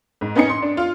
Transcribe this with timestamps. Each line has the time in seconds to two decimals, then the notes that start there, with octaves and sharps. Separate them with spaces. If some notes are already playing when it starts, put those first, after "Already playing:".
0.21 G#2
0.35 B3 C#4 D#4 G#5 C#7
0.49 C6
0.62 D4
0.77 F4